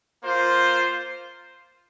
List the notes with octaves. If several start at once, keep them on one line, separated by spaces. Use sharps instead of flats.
A#3 F4 C5